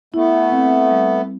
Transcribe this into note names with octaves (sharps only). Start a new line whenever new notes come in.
A3 B3 E4
C4
G3